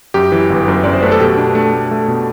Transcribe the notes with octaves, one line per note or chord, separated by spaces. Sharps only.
F#2 G4
E3
G1
F#2
F#2 D5
C5
A3 B4
A4
B2 G4
D4
A3
A3
A3
B2